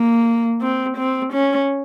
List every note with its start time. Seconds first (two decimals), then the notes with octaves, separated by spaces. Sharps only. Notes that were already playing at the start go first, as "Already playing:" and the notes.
Already playing: A#3
0.62 C4
0.97 C4
1.33 C#4